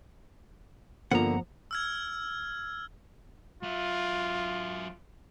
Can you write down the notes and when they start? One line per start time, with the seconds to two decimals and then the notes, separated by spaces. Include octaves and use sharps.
1.12 G2 D3 F3 A#3 B3 F#5 A#5
1.71 E6 F6 G#6
3.63 F#3 F4 E5